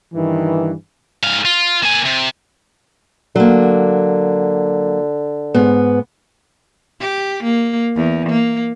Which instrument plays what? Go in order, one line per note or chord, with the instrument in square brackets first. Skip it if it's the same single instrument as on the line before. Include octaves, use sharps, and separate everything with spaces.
[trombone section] G2 D#3 E3
[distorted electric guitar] G#2 F5
F4
A#3 G#5
C3
[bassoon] D3 [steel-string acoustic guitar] F#3 A#3
[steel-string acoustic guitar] G#2 B3
[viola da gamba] G4
A#3
E2
A#3